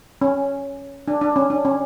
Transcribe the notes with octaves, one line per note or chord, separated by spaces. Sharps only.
C#4
D4
D4
C#4
D4
C#4